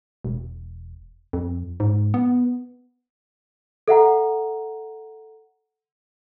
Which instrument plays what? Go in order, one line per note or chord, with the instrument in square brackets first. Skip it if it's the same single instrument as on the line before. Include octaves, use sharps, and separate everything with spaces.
[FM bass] E1
F2
G#2
B3
[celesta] A4 E5 F#5 A#5